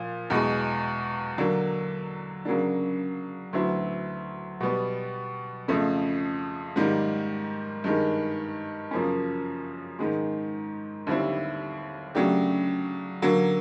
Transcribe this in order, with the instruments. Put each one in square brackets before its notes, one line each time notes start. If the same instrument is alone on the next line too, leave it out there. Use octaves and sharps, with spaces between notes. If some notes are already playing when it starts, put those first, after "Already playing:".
Already playing: [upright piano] A#2 F3
E2 B2 G#3
D3 F#3 A#3 D4
C#3 F#3 A#3 D4
D2 D3 F#3 B3 E4
B2 G3 B3
F2 C#3 F3 A3
G#2 D#3 G3 A#3
G2 D#3 G#3
F#2 C#3 F3 A#3 C#4
G#2 D#3 G#3
D#2 D3 G3 C4 E4
C#3 F#3 A3 D4 G4
D3 F#3 A#3